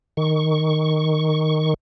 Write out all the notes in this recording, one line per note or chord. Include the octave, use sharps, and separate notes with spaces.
D#3 C#6